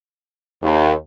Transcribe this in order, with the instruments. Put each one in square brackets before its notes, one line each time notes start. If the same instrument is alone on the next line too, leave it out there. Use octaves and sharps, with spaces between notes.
[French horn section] D#2